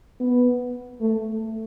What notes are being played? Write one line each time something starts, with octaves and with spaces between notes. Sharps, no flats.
B3
A3